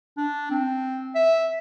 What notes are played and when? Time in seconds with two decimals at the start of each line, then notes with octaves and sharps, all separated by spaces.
0.18 D4
0.51 C4
1.15 E5